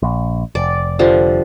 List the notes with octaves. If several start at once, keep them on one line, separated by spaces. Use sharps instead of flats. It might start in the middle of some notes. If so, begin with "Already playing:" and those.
A#1
F1 D5
D3 F3 G3